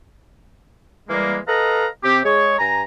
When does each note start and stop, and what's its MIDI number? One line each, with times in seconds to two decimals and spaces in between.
1.08 1.36 52
1.08 1.36 55
1.08 1.36 56
1.08 1.36 58
1.47 1.86 69
1.47 1.86 71
1.47 1.86 75
1.47 1.86 77
1.47 1.86 82
2.03 2.18 48
2.03 2.18 60
2.03 2.18 67
2.24 2.57 56
2.24 2.57 68
2.24 2.57 73
2.58 2.82 43
2.58 2.82 80
2.58 2.82 82